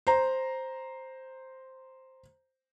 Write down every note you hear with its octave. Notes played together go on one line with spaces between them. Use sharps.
C5 A#5